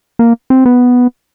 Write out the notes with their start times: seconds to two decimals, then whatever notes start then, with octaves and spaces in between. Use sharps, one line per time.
0.19 A#3
0.50 C4
0.66 B3